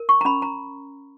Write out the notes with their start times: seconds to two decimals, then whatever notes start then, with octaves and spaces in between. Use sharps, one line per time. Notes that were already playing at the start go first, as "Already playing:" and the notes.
Already playing: A#4
0.09 C#6
0.21 A#5
0.25 C#4 B5
0.42 A#5